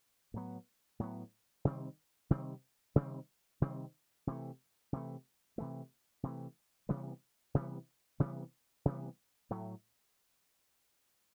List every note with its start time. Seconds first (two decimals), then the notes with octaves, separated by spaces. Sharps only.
0.34 A2 F#3 B3
1.00 A2 F#3 B3
1.65 C3 D#3 G3 C4
2.30 C3 D#3 G3 C4
2.96 C3 D#3 G3 C4
3.61 C3 D#3 G3 C4
4.27 C3 E3 A3
4.93 C3 E3 A3
5.58 C3 E3 A3
6.23 C3 E3 A3
6.89 C3 E3 G3 B3
7.54 C3 E3 G3 B3
8.20 C3 E3 G3 B3
8.85 C3 E3 G3 B3
9.50 A2 F#3 A3